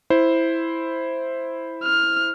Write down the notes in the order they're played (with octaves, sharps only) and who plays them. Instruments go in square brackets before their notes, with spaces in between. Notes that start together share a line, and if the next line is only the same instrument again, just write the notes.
[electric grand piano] E4 C5
[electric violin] F6